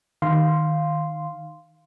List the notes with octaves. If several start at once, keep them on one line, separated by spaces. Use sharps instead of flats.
D#3 F5 C6